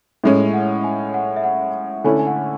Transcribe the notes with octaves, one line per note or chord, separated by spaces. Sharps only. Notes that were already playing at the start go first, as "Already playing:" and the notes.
A2 G#3 C#4 E5
F#5
G#5
F#5
E5
F#5
D3 A3 C#4 E4 G#5
G#5
F#5